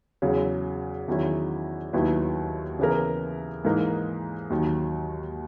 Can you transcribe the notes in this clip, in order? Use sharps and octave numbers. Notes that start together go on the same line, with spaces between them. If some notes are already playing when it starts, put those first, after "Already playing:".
E2 C#3 F#3
E2 D#3 F#3 C#4 E4
D#2 D#3 F#3 B3 E4
C#3 E3 B3 E4 A#4
G#2 E3 A#3 D#4 A#4
D#2 D#3 F#3